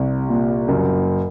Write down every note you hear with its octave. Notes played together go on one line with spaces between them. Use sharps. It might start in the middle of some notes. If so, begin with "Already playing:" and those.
Already playing: C2
A#2
F#1